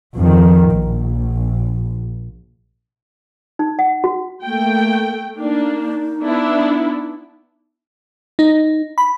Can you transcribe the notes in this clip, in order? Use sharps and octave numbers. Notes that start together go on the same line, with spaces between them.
F2 D#3
A#1
D#4
F#5
F#4
A3 A#3 G5
A#3 D4 D#4
B3 D4 E4
D#4
B5